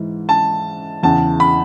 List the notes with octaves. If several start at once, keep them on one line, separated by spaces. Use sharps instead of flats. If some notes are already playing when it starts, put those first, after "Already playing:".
Already playing: G#2 E3
A5
E2 C#3 E3 A5
B5